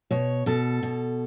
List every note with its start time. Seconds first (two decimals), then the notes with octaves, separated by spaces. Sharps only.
0.11 B2 C#5
0.46 B2 A4
0.83 B2